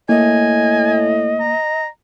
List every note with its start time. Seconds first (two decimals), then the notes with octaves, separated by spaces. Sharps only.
0.09 A2 A#3 D#5 G#5
1.40 A#5